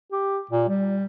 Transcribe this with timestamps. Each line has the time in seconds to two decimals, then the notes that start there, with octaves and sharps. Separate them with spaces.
0.12 G4
0.51 A#2
0.68 G3